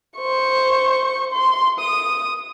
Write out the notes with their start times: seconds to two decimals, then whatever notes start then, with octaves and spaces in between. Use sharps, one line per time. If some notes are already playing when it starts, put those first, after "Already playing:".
0.18 C5 C#6
1.32 C6
1.79 D#6